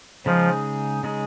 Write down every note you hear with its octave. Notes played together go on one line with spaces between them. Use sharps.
C#3 F3 G#3 D#4 G#4
C#3 G#3 D#4 G#4